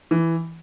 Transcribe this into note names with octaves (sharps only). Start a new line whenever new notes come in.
E3